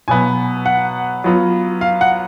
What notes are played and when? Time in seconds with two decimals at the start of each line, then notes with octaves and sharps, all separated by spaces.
0.08 B2 F#3 B3 G#5
0.66 F#5
1.24 F#3 B3 F4
1.81 F5
2.01 F#5